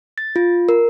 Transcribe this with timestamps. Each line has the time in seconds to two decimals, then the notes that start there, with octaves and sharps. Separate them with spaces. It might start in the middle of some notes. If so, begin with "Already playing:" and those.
0.18 A6
0.36 F4
0.69 A#4